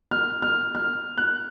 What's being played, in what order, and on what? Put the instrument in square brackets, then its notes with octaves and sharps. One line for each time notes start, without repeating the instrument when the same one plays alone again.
[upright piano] F6
F6
F6
F#6